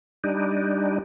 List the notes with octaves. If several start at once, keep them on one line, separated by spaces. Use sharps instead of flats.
G3 D4 D#4